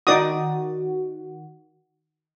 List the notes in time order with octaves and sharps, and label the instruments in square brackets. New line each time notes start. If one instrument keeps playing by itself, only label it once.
[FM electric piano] D#3 F#4 [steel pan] D#4 D5 D#6